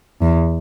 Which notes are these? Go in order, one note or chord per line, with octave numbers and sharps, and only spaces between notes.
E2